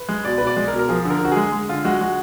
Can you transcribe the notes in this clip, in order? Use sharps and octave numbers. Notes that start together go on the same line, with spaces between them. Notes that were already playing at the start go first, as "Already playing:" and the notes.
Already playing: B4
G#3
B2 D5
B4
B2
D5
G#3
A#4
B2
A#4
F3 G#4
D3 A#4
D3 F#4
G#3 G#4
G#3
D3 F4
G#3 F#4
G#3 F#4